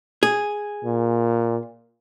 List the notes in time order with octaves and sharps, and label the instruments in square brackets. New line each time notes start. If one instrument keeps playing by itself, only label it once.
[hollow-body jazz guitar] G#4
[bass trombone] A#2